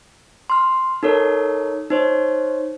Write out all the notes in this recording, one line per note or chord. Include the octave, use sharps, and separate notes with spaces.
C6 F6
D#4 A4 A#4 C#5
D#4 C5 C#5